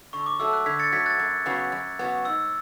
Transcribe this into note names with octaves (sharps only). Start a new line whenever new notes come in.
D3 C#6
D6
F#3 A3 E6
F#6
D3 G#6 B6
A6 C#7
F#3 A3 G#6 B6
F#6 A6
F#2
C#3 F#3 B3
F#2
C#3 F#3 B3
G#2 E6